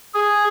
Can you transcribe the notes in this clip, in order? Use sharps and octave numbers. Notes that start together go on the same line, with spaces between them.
G#4